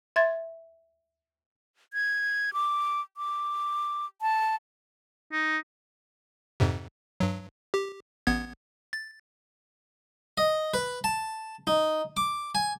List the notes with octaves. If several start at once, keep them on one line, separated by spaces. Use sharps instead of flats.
E5 C6 G#6 A6
G#6
D6
D6
A5
D#4
F2 G#2 C3
G2 F#3
G4
A1 B3 G#6
A6
D#5
B4
A5
D#4
D6
G#5